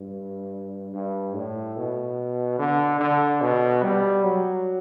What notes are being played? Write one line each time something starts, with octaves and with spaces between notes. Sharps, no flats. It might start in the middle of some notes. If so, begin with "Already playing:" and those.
Already playing: G2
G2
A2
B2
D3
D3
B2
G3
F#3